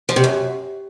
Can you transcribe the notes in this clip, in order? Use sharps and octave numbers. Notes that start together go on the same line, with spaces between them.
F3
C3
F#2